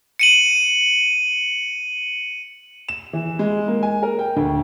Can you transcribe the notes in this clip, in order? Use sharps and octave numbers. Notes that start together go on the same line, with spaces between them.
C#7 D#7 F#7
E7
E3
G#3
A#3
G#5
A#4
G5
D2